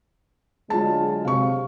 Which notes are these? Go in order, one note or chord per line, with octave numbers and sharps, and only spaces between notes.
D3 F#3 G#3 F4 A5
C3 F5 C#6